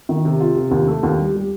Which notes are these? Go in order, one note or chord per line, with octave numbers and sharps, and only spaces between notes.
D#3
C3
F4
C3
D#2
A3
D#2
G3
G3